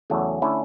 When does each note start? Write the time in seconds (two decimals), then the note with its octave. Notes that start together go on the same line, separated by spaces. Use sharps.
0.10 E2 C#3 F#3 A3
0.42 D3 A3 C#4 E4